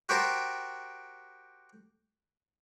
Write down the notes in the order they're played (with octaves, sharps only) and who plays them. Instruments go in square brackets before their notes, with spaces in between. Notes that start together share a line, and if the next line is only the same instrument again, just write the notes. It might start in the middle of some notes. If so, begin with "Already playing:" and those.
[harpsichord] F#4 G4 A#4 C5 G5 A5